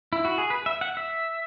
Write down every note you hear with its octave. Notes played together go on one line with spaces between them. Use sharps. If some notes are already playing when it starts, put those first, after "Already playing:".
E4
F#4
G#4
B4
E5
F#5
E5